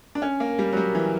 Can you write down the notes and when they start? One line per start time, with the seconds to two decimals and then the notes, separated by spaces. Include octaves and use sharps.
0.15 D4
0.22 C#4
0.40 A#3
0.59 G3
0.73 F#3
0.77 G3
0.95 E3